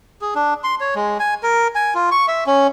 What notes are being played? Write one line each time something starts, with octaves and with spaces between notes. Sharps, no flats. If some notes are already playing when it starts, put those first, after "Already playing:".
G#4
D4
C6
C#5
G#3
G#5
A#4
G#5
F4
C#6
E5
C#4